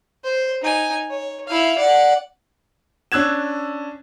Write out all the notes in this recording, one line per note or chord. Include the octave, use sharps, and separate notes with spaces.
C5
D#4 G#5
C#5
E4 F5
D5 F#5
C#4 D4 E6 F#6 G#6 E7